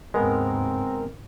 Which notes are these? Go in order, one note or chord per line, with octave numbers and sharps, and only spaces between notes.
D#2 G#2 C#3 G#3 B3 C4 A#4